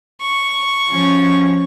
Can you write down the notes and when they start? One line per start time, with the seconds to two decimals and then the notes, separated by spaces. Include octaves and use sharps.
0.21 C#6
0.90 F3 C#4